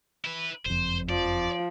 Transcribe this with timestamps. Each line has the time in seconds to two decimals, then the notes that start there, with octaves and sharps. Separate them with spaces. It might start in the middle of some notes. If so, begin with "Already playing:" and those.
0.25 E4 B4
0.66 F#1 F2 C5
1.09 F3 D5